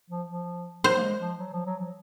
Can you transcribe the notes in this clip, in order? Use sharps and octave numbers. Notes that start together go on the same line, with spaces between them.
F3
F3
F#3 C5
A#3
G#3
F3
F#3
F3
F#3
F3